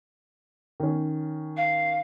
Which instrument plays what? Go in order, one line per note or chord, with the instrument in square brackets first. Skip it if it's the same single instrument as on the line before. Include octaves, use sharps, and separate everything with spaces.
[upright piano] D#3 C#4
[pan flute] F5